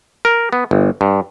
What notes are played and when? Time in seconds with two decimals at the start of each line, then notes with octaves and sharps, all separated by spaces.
0.25 A#4
0.53 B3
0.71 G1
1.01 G2